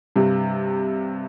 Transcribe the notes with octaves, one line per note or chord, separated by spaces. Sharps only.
G2 C3